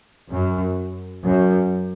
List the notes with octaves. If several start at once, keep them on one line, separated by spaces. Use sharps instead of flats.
F#2
F#2